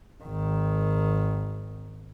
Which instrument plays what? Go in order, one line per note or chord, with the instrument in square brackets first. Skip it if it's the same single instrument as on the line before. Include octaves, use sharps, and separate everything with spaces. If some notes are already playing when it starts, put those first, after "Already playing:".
[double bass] G#1 D#3